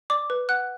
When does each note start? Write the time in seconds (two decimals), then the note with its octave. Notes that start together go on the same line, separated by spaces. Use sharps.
0.10 D5 D6
0.30 B4
0.49 F#5 F#6